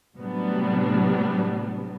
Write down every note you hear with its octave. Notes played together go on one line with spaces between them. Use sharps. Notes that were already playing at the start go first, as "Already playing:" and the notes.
A2 C3 F#3 G3 B3 D4